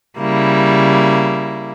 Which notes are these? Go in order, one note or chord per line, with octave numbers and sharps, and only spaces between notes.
C#3 G3 A#3 E4